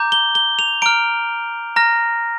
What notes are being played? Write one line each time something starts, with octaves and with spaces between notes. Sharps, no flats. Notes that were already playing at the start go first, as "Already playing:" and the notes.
Already playing: A#5 D6 G6
G7
G7
F7
A#5 F6 D7
A#5 F6 A#6